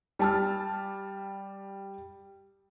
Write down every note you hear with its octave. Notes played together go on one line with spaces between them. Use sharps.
G3 A5 F6